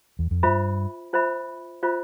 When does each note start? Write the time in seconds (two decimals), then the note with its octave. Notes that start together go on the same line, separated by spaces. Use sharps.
0.19 E2
0.31 F2
0.43 G2 F4 C5 E5 B5
1.13 F4 C5 E5 B5
1.83 F4 C5 E5 B5